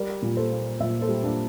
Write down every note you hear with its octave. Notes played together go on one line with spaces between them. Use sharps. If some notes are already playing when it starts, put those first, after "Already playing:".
Already playing: G3 A#4 D5
A#2
A4 C5
A#3
A#2 C5 E5
A4 C5
G3
A#3 D4